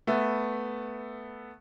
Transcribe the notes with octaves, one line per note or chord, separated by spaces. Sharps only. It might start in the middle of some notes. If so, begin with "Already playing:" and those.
A3 B3 E5